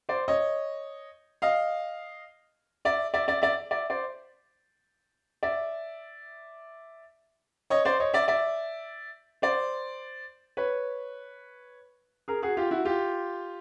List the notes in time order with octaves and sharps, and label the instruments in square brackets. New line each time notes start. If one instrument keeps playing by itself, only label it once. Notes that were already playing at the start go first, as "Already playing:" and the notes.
[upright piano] C5 D5
C#5 D#5
D#5 F5
D5 E5
D5 E5
D5 E5
D5 E5
D5 E5
C5 D5
D5 E5
C#5 D#5
C5 D5
C#5 D#5
D5 E5
D5 E5
C5 D5
B4 C#5
G#4 A#4
F#4 G#4
F4 G4
E4 F#4
F4 G4